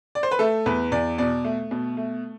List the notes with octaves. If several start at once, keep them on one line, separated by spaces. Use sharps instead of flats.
D5
C5
B4
A3 A4
E2 B4
E2 D5
B2 D5
A3
B2
A3